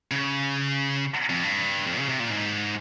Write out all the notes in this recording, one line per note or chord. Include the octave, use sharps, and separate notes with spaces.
C#3
F2
G2
F2
C#3
C3
A#2
G#2